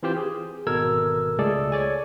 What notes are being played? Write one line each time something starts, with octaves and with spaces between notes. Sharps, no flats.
E3 C4 F4 G4 C5
G#4
G#1 B2 A4 A#4 E6 G#6
C#2 G#3 A3 G#4 A4 D5
C#5 D5 G#5